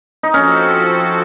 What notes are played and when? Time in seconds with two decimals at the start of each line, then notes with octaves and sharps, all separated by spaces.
0.23 D#4
0.34 F3 C4 C#4 F#4 A4